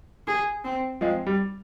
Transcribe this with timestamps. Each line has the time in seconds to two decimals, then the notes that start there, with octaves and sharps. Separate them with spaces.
0.27 G#4
0.64 C4
1.01 F3 G#3 C4
1.27 G3